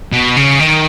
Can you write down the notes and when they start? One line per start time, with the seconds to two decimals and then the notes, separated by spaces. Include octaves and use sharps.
0.12 B2
0.37 C#3
0.60 D#3